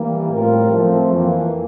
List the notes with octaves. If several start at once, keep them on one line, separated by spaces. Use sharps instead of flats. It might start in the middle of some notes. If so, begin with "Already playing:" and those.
Already playing: E3 G3 A#3
A2 G3 C4 F4 A#4
F3 A3 C4
F2 E3 A#3